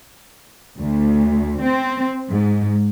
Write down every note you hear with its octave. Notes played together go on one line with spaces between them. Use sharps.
D2
C4
G#2